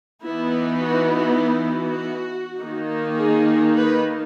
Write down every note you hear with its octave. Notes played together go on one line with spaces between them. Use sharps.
E3 B3 D#4 E4
F#4
F#4
D#3 A#3 D#4
G#4
B4